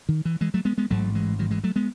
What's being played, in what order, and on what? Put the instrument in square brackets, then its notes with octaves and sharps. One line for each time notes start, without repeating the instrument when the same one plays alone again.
[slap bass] D#3
E3
E3 G#3
F#3 A3
G#3 B3
G#3 B3
A1 G#2 F#3 A3
E3 G#3
D#3 F#3
E3 G#3
F#3 A3
G#3 B3